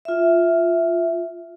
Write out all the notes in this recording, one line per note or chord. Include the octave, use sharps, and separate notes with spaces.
F4 E5